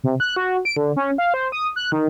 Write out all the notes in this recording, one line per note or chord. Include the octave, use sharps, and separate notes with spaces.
C3
F#6
F#4
D7
D3
C#4
F5
C5
D#6
F#6
D#3